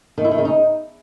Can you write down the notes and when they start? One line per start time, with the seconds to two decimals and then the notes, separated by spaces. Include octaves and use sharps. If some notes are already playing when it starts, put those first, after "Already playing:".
0.18 D#3
0.24 E4
0.31 D#3
0.38 C#3
0.45 D#4